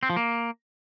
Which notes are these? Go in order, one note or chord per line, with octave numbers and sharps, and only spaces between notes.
C4
F3
A#3